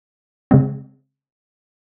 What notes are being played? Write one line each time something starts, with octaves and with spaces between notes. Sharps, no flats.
C#3 G#3 C4